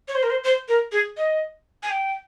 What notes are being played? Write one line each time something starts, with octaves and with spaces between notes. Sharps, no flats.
C#5
C5
A#4
C5
C5
A#4
G#4
D#5
G#5
G5